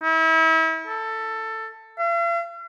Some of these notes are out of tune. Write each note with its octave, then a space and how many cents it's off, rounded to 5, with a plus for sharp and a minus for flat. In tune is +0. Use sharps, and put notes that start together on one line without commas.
E4 -35
A4 +15
F5 -45